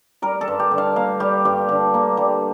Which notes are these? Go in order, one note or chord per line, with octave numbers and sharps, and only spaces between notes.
G3 A#4
A4
G2
G4
D3
F5
A#3 F5
G3 G4
G2 G4
D3
A#3
G3